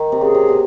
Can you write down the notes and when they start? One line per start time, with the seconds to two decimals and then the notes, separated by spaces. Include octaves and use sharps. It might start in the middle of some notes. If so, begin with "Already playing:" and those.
Already playing: D#3
0.12 C3
0.21 C#3 G#4
0.35 C3
0.49 B2